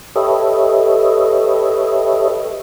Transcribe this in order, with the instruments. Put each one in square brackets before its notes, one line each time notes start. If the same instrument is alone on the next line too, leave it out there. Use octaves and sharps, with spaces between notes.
[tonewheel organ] G4 A4 B4 C#5 D#5 E5